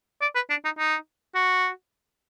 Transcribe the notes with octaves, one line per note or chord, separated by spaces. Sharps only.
D5
B4
D4
D#4
D#4
F#4